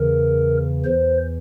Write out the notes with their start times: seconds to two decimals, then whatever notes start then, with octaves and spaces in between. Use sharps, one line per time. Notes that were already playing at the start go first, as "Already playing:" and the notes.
Already playing: E2 C#3 E3 A#4
0.85 E2 E3 C5